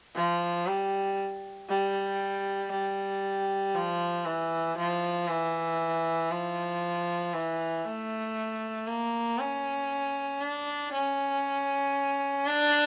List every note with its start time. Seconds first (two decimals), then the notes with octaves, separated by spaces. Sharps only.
0.16 F3
0.67 G3
1.69 G3
2.72 G3
3.75 F3
4.26 E3
4.77 F3
5.28 E3
6.31 F3
7.34 E3
7.85 A3
8.87 A#3
9.39 C#4
10.41 D4
10.93 C#4
12.47 D4